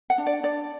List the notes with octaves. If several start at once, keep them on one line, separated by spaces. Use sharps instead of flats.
F#5
D4
D5
D4 D5